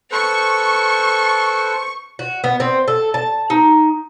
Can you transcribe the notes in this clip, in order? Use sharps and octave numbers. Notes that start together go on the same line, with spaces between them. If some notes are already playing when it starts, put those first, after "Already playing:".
A4 B4 C5 C#6
F#4
B3
C4
A4
A5
D#4